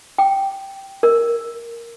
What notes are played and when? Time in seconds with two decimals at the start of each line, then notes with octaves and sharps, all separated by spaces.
0.18 G5
1.03 A#4